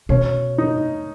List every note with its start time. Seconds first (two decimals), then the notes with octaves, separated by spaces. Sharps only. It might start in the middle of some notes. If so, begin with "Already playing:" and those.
0.09 B2 C#4
0.58 D#4